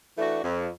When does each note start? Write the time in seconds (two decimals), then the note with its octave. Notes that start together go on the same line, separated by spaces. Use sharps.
0.17 E3 A3 D4 F#4
0.43 F2